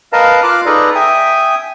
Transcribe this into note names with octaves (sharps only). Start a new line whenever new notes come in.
A#4 B4 D#5 F5 A5 A#5
F4 F5 D6 F6 F#6
D#4 G#4 A4 B4 D5 A#5
E5 G5 G#5 D#6